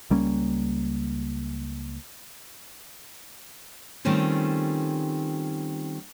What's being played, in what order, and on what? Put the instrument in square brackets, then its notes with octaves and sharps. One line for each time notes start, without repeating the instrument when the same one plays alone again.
[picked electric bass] C#2 G3 A#3 C#4
[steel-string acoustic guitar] D#3 G3 A3 C4 C#4 F4